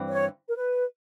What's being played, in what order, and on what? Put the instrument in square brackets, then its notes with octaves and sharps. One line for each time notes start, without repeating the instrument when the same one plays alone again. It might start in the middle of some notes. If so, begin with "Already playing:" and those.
Already playing: [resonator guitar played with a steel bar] G2 E3 C4
[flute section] C#5
A#4
B4